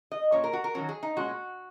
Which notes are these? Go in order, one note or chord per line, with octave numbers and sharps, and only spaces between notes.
D#5
A#2 A#3 C#4 C#5
A#4
F#4
A#4
D#3 F#3 C#4 F#4
G#4
D#4
A#2 G#3 C#4 F#4